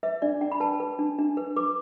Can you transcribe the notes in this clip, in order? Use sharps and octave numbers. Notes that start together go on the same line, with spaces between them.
B4 E5
D4 D5
D4 G5
B5
B4 A5
B4
D4
D4
B4
B4 D6